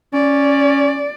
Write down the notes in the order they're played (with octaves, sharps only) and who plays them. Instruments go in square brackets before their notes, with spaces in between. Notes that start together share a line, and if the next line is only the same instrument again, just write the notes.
[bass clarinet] C#4 [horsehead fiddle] D5